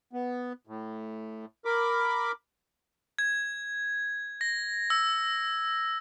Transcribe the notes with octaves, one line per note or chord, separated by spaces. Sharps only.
B3
A2
A#4 B5 D6
G#6
A#6
E6